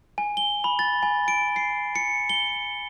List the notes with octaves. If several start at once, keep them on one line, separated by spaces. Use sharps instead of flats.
G#5
G7
B5
A6
G#5
D7
C7
C#7
G7